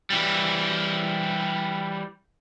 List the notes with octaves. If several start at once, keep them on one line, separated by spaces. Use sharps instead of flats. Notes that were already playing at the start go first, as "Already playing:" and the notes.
E3 G3